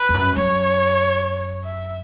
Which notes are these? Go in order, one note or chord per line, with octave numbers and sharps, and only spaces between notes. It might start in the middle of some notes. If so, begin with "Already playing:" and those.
Already playing: B4
E2
F#2
F#2 C#5
E5